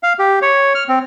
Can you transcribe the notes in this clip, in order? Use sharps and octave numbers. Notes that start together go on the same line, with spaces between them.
F5
G4
C#5
F6
C4